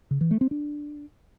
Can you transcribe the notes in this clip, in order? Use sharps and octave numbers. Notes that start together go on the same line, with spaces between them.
C#3
E3
A3
C4
D4